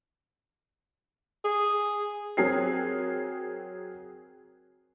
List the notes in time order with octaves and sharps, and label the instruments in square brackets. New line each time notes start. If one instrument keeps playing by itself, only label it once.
[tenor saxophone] G#4
[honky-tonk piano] F#3 C4 G#4 A#4 C7